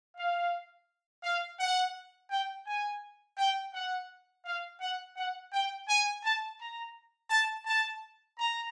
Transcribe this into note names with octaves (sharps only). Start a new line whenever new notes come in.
F5
F5
F#5
G5
G#5
G5
F#5
F5
F#5
F#5
G5
G#5
A5
A#5
A5
A5
A#5